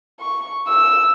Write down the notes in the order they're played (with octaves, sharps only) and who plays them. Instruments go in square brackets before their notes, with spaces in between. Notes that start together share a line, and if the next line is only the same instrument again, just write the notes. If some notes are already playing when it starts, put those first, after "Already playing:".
[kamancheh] C#6
E6